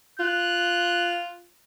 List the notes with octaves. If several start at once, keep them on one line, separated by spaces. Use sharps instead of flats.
F4 F#6